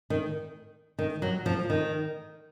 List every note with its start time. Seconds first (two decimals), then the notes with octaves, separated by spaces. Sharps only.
0.10 D#3
0.99 D#3
1.22 F#3
1.46 F3
1.70 D#3